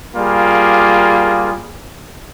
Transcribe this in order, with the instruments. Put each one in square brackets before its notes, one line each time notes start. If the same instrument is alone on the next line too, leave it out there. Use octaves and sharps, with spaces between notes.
[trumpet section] G3 A#3 F4 G#4